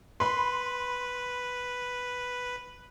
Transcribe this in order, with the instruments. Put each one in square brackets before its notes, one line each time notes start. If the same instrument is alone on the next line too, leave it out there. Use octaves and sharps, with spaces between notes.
[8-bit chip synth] B4 [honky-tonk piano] B5 C6